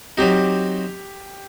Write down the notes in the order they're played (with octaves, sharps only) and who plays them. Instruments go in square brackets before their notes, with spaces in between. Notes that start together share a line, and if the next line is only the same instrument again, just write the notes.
[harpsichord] F#3 C4 D#4 [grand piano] G4